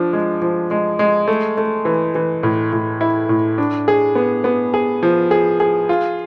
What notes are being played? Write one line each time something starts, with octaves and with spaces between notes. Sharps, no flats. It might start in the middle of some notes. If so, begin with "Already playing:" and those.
Already playing: F3 D4
G#3
F3
G#3
G#3
A3
A3
E3
E3
A2
A2
E4
A2
D4
G#4
B3
B3
G#4
F3
G#4
G#4
F4